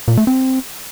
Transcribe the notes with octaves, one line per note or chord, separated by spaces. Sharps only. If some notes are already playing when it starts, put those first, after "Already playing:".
A#2
A3
C4